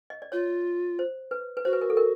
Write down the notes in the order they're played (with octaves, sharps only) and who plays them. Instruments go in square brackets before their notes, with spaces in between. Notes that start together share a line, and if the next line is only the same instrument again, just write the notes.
[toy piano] D#5
D5
[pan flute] F4 [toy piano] C#5
[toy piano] C5
B4
B4
[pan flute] F#4 [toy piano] C5
[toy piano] B4
A#4
A4
A#4